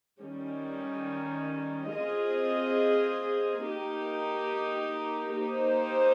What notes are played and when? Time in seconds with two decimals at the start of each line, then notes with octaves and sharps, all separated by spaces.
0.21 D#3 G3 C#4
1.93 C4 F4 G#4 D#5
3.63 A#3 D#4 G4
5.35 A#3 D#4 G4 C5